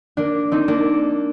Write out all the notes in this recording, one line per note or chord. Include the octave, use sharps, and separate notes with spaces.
A#3 D4
C4 D#4
A#3 D4